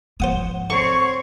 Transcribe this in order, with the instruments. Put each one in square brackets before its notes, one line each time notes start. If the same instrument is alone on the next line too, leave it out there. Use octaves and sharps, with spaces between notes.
[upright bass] G#2 F3 [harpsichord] C5 F#5 D#6
[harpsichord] D3 [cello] C4 C#5 [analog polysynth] C#6